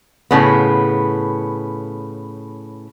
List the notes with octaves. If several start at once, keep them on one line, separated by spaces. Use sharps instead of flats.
A2 C#3 B3